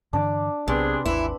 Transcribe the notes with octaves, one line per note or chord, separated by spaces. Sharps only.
G2 D3 E3 D4 D5
B1 C3 B3 C4 D4 G#4 B4
G#1 D#2 E3 E4